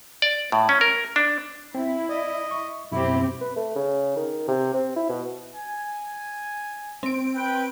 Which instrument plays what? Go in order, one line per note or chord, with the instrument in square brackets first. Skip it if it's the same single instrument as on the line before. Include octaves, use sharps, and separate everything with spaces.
[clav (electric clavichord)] D5
A2
C#4
A#4
D4
[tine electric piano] C4 [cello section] E4
[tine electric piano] D5 [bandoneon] D#5
[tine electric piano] C#6
[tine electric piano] F#2 B2 [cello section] C4 G4 [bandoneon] E4
[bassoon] B4
A3
C#3
D#3
C3
C4
E4
B2
[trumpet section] G#5
[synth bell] C4 D7
[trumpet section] B4 G5